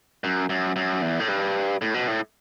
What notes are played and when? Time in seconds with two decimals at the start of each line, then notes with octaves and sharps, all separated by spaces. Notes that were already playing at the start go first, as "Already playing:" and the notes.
0.24 F#2
0.49 F#2
0.76 F#2
1.02 E2
1.20 A2
1.29 G2
1.82 A2
1.94 B2
2.08 A2